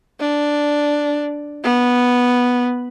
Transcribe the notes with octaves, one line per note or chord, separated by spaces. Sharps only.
D4
B3